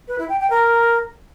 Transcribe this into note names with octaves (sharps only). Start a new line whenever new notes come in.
B4
E4
G5
G5
A#4